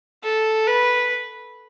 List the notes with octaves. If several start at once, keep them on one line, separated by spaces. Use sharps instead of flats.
A4
B4